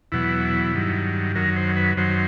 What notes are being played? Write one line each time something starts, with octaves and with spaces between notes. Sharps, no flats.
E2 B2 F#3 E4
G2 D#3 F#3
F#2 D#3 F#3 A#4
C5
B4
F#2 D#3 F#3 C5